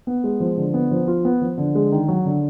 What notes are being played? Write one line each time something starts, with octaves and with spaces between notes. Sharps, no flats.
B3
G#3
F3
D3
B3
F3
F4
B3
F3
D3
G#3
D#3
F#3
D3